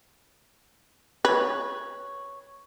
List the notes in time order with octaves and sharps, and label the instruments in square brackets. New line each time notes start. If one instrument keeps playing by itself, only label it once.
[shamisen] B4 [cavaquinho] C#5